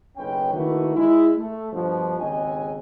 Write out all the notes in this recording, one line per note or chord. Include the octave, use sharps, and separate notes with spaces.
F#1 B1 C#4 B4 G5
D#3 A3 A#3 E4 F#4 B4
G#3 E4
A3
G2 B2 D3 F3
G#1 D#2 C#3 B3 D#5 G#5